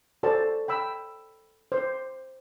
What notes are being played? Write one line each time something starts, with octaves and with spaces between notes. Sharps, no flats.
F#4 A4 C5 D5 A5
G5 B5 E6
C5